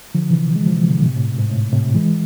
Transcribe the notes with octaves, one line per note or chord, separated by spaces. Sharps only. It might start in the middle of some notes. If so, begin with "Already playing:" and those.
D3 F3
C3 E3
G#3
F3
C3 E3
B2 D3
A2 C3
A2
G#2
G#2
A2
A2 C3
E3 G#3